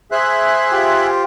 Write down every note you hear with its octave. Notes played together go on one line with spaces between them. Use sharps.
G#4 C5 E5 F#6
F4 G4